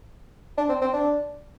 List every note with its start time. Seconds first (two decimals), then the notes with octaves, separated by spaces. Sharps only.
0.58 D4
0.69 C4
0.81 C4
0.93 D4